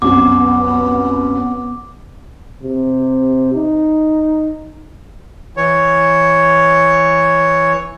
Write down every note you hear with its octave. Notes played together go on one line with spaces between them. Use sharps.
C2 F#2 B3 D6
C3
D#4
E3 C#5